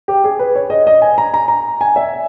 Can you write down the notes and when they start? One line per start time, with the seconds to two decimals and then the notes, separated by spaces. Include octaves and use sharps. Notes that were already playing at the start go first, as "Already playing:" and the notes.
0.08 G4
0.24 G#4
0.39 B4
0.55 C#5
0.70 D#5
0.87 D#5
1.02 G#5
1.18 A#5
1.34 A#5
1.48 A#5
1.81 G#5
1.96 E5